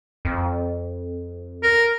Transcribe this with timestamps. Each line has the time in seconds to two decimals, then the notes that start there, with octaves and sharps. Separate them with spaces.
0.25 F2
1.63 A#4